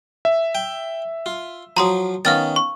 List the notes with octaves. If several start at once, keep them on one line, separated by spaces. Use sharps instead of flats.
E5
G5
F4
F3 F#3 A#5 C6 D#6
D#3 B3 C#4 F5 F6 A6
C#6